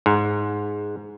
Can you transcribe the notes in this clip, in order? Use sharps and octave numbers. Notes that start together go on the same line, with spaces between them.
G#2